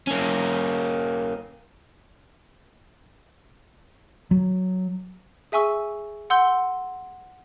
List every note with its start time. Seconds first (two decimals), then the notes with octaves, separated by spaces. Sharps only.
0.07 A#3 C#4
4.31 F#3
5.52 G#4 E5 G#5 C#6 E6
6.30 F#5 C6 E6 G6 G7